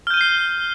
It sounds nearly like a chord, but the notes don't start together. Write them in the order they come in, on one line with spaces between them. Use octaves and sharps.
F6 G6 D#7 G7 C7